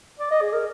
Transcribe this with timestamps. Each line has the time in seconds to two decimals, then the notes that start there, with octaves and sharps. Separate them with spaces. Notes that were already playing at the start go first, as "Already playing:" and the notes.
0.19 D5
0.31 D#5
0.41 G#4
0.53 A#4